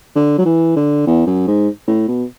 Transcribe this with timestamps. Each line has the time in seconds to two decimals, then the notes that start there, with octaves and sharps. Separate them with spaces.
0.15 D3
0.38 F#3
0.45 E3
0.76 D3
1.07 E2
1.27 F#2
1.47 G#2
1.88 A2
2.08 B2